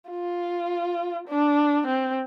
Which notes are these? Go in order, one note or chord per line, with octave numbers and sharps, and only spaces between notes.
F4
D4
C4